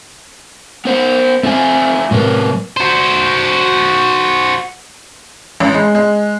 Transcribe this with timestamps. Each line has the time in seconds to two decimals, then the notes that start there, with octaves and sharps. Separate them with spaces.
0.85 B3 C5 F#5
1.43 A3 C4 F4 G#5
2.11 A2 C3 F#3 A#4 B4
2.77 F#4 C5
5.60 A1
5.74 G#3
5.95 G#3